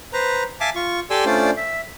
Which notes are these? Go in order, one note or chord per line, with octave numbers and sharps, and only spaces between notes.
B4 C5 A#5
E5 F5 G#5 A5 D6
F4 C#6
G4 A4 D5 G#5 C6 E6
A3 C#4 D4 F4 C5 D5
E5